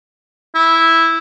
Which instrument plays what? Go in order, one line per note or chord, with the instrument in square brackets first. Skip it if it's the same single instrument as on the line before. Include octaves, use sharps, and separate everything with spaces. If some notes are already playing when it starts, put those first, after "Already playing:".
[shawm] E4